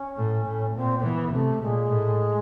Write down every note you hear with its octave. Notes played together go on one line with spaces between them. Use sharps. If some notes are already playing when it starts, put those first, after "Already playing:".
Already playing: C#4
A2
A2
A#2 C4
C4
E3 B3
C3 A3
A#2 G#3
A2